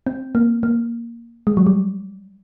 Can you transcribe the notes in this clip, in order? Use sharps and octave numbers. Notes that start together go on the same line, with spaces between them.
C4
A#3
A#3
G#3
F#3
G3